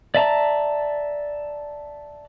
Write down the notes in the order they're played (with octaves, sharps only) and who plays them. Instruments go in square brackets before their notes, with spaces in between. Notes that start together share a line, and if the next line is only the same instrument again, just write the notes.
[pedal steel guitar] D5 E5 A5 A#5